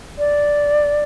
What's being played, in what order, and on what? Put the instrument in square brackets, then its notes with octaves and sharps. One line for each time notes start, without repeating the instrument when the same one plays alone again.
[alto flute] D5